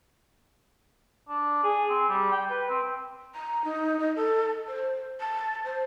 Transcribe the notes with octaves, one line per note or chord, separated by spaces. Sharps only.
D4
G#4
C4
G3
G5
B4
C4
A#5
D#4
D#5
A4
C5
A5
C5